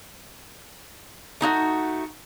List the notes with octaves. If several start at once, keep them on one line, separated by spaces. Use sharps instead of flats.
A3 D#4 E4 F#4